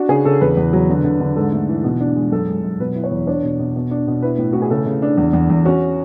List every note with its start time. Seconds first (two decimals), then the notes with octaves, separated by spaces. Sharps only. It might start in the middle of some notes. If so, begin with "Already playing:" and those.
Already playing: D4 F#4
0.09 C#3 G#4
0.25 C#3 A4
0.41 E2 B4
0.57 E2
0.73 F#3
0.89 D3
1.04 D3
1.20 D3
1.36 G#2 A4
1.52 A3
1.69 E3
1.84 B2
2.00 D4
2.16 G#3
2.32 F#2 A4
2.47 G#3
2.64 F#2
2.80 B2 B4
2.95 E4
3.04 C#5
3.11 E2
3.27 D4 C#5
3.44 B2
3.59 B2
3.76 B2
3.91 D4
4.07 B2
4.22 E4 B4
4.38 A2
4.53 A2 F#4
4.62 G#4
4.70 C#3 A4
4.86 C#3
5.02 D4
5.18 E2
5.34 E2
5.50 E2
5.65 C#4 F#4